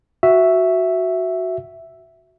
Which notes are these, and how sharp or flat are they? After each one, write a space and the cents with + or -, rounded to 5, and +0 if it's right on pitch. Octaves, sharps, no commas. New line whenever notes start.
F#4 +0 E5 +0